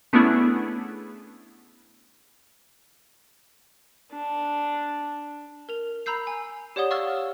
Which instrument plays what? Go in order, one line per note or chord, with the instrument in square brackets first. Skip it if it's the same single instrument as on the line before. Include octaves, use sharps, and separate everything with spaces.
[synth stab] A3 B3 C#4 D4 E4 G#4
[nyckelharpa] D4
[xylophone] A#4 F7
A#5 B5 E6 G6 C7
G#5
G4 C#5 D5 F#5 D#6 G7
F5 C#6 E6 F6 A6